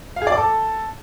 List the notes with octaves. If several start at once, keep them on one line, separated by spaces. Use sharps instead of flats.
F5
G#4
D5
D6
A4